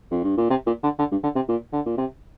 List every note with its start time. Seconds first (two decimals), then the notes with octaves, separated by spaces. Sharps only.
0.11 F2
0.24 G2
0.37 A#2
0.50 C3
0.66 A#2
0.83 D3
0.99 D3
1.11 G2
1.23 D3
1.36 C3
1.48 A#2
1.73 D3
1.86 A#2
1.98 C3